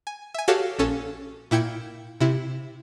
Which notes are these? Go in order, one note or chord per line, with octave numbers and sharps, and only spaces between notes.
G#5
E5 G#5
F#4 G4 A4 C#5 F5 A5
A#1 C#4 A4
A#2 E4 G5 G#6 C#7
C3 E4